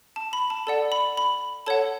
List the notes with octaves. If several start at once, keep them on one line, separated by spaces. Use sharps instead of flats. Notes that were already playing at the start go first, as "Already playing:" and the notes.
A5
B5
A5
A4 D5 F#5 A5
B5
B5
A4 C#5 F#5 A5